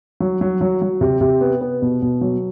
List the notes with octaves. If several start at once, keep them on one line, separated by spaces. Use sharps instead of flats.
F#3
F#3
F#3
F#3
C3
C3
B3
B3
B2
B2
F#3